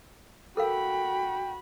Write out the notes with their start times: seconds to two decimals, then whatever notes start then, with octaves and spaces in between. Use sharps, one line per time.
0.57 F#4 A4 A#4 F5 G5 B5